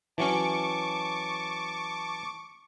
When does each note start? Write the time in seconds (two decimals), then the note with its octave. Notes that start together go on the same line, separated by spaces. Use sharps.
0.18 E3 F#3 C#4 A5 C#6 D6